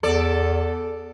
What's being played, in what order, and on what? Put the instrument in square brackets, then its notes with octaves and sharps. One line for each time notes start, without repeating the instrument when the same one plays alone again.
[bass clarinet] E2 [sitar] A4 D5